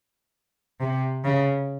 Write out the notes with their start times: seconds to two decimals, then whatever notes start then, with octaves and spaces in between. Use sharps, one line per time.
0.80 C3
1.24 C#3